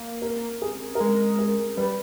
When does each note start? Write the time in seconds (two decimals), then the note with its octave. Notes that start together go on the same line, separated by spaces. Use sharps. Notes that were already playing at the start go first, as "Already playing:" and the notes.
Already playing: A#3
0.22 A#4
0.62 G#4
0.95 A#4
0.99 G#3 G#4
1.39 A#4
1.77 G3 B4